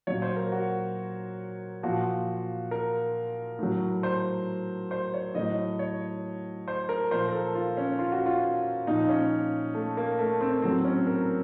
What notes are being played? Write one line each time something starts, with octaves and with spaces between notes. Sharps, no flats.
A#2 F#3 C#5
C5
A#4
F#4
A#2 F3 F#4
A#4
A2 F#3
C5
C5
C#5
A2 F#3 D#5
C#5
C5
A#4
A#2 F3 C5
A#4
A4
F4
C#4
F4
F#4
F4
A#2 F3 D#4
C#4
A3
A#3
A3
C4
A2 F#3 C4
C#4
A#4